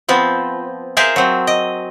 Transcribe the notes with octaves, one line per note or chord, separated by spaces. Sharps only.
F3 B3 C4
G#4 A#4 C5 E5 F5
F#3 C4
D#5